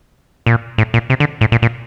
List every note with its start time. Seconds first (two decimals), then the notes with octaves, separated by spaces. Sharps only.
0.46 A#2
0.78 A2
0.94 A#2
1.10 C3
1.20 D3
1.41 A2
1.52 A#2
1.62 A#2